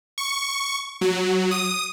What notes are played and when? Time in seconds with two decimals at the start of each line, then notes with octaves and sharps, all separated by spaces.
0.18 C#6
1.01 F#3
1.51 D#6